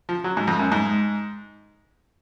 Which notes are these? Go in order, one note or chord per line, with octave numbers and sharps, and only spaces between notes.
F3
F#3
G#2
F2
F#2
G#2